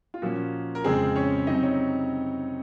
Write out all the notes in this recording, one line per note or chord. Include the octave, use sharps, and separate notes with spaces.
F4
A#2 F3 A#3 C#4 F#4
A#4
F2 C#3 G#3 C4 G#4
C#4 C#5
C3 F#3 C4 D#4 D#5
C#4 C#5